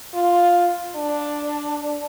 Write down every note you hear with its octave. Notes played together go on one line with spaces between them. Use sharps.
F4
D4